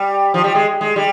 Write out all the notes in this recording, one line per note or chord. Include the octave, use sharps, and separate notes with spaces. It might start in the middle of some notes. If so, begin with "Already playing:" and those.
Already playing: G3
F3
G3
G#3
G#3
G3